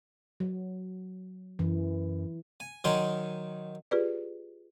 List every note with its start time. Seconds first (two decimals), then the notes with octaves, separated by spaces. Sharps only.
0.40 F#3
1.59 F#2 E3
2.60 G#5
2.84 D#3 F#3 A#4 G5 G#5 C6
3.91 F4 G4 G#4 B4 D5